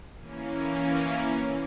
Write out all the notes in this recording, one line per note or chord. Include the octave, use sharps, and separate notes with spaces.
E3 A#3 C#4